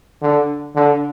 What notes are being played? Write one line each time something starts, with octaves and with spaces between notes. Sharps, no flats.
D3
D3